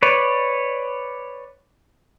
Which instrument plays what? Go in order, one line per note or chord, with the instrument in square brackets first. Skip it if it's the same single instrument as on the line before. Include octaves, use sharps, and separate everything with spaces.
[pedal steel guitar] B4 C#5 D5